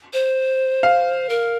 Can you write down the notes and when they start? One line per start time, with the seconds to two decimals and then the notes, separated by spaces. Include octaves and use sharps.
0.13 C5
0.83 F5
1.29 A#4